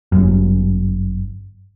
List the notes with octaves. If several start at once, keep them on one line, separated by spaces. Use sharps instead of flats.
G1 F#2